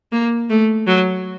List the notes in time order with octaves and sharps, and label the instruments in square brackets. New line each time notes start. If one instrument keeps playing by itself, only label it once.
[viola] A#3
A3
F#3